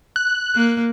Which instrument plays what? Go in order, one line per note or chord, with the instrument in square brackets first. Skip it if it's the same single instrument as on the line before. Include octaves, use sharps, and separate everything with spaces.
[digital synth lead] F#6
[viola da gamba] A#3